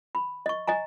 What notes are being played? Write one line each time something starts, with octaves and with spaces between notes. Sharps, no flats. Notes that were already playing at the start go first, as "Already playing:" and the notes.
B5
D#5 C#6
D#5 G#5 A#5